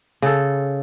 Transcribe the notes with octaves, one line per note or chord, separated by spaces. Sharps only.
C#3 A4